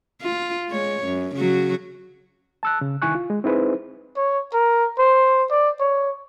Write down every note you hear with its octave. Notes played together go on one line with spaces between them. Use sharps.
F4
G#3 C#5
F#2
C#3 F#3 F#4
A5 E6 F#6
C#3
C2 D#3 E4 G#5 C#6 F#6
F4
G#3
C4 D#4 E4 G#4 B4 C5
C#5
A#4
C5
D5
C#5